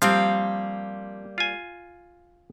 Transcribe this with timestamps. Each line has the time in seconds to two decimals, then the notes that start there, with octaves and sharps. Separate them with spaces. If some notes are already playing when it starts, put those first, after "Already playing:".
0.02 F3 G3 A#3 C4 F5
1.38 F4 G#5